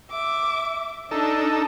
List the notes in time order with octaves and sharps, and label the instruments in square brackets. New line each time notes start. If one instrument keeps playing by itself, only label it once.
[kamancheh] E5 D6
[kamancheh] D4 [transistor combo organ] D#4 A4